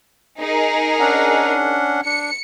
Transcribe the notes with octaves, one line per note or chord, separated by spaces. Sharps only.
D#4 G#4 A#4
C#4 D4 F#5
D4 C#7